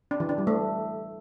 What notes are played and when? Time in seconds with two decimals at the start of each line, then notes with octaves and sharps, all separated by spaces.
0.11 D4
0.20 E3
0.29 D4
0.38 G3
0.47 A3